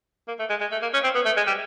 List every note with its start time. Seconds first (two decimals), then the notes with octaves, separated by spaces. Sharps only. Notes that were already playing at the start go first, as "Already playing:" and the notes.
0.28 A#3
0.39 A3
0.50 G#3
0.60 G#3
0.72 A3
0.82 A#3
0.94 C#4
1.04 C4
1.15 B3
1.25 A3
1.37 G#3
1.47 G3